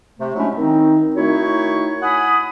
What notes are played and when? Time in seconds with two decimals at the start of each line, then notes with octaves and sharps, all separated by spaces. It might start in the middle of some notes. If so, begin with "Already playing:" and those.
0.20 C3 A3
0.35 F#3 G#3 A3 C#4 D4 E4
0.57 D#3 C4 D#4
1.16 D#3 A3 D#4 E4 F#4 C#5
2.02 F#5 G#5 B5 D#6